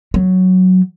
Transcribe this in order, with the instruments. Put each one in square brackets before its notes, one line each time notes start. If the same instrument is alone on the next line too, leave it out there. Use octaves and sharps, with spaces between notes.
[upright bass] F#3